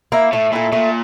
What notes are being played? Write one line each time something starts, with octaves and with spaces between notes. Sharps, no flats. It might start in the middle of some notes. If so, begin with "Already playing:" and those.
A#3 E4
A2 A3
A#2 E4 A4
A#2 A3